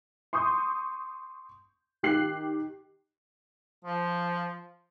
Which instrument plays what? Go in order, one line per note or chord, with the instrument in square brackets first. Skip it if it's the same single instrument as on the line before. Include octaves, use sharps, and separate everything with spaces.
[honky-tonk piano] C6 C#6 D#6 G6
D#3 G4 F#6 C7 F#7
[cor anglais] F3